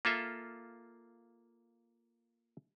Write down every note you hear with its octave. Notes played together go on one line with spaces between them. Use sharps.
A#3 F4 A4 E5